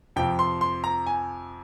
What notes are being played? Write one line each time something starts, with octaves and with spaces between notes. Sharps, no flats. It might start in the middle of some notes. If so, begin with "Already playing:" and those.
F2 C3 F3 G5
C6
C6
A#5
G#5